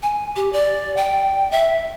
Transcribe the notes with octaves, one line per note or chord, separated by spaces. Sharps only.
G#5
G4
D5
G5
E5